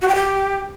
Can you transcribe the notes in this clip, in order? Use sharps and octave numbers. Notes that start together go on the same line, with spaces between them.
F#4
G5
G4